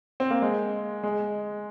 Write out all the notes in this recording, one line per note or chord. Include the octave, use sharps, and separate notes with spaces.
C4
A#3
G#3
G#3